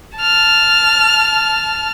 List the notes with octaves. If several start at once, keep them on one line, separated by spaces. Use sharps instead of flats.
A5 F6